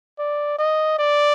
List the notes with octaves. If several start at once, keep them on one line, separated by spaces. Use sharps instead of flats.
D5
D#5
D5